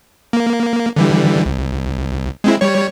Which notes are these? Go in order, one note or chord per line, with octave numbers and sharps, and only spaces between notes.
A#3
D3 E3 G3
C2
G#3 C4 E4
G3 C#5